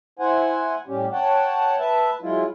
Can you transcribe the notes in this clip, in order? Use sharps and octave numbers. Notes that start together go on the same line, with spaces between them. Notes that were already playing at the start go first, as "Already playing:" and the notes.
E4 C5 F#5 G#5
A2 G3 C#4 G4
C#5 F#5 G5 A5
B4 E5 A5
F#3 G#3 E4 F4